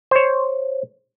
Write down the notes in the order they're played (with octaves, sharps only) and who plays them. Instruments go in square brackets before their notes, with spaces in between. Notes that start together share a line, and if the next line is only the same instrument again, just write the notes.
[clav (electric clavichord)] C5 C#5